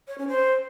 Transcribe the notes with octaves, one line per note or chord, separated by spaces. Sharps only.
C#5
C#4
C5